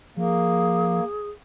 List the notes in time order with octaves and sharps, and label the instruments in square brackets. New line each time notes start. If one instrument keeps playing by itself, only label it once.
[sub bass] F3 [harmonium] A#3 [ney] G#4